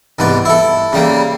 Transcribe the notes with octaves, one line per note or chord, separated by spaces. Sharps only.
C2 G#2 B3 D5
E4 A4
C#3 G3 A#3